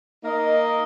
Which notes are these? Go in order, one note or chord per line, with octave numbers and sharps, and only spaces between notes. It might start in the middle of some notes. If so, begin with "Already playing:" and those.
A#3 D#4 A#4 D#5